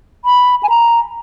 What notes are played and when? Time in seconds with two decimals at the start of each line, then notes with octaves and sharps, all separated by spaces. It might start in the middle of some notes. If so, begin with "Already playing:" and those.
0.25 B5
0.63 G#5
0.70 A#5